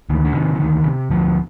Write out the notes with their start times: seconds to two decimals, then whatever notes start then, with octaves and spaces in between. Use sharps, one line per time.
0.10 D2 D#3
0.25 D3
0.34 C3 D#3
0.55 E3
0.60 D2 D#3
0.85 C3
1.11 D2 F3